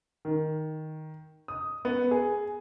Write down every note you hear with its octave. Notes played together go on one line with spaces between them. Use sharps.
D#3
D#6
B3
G#4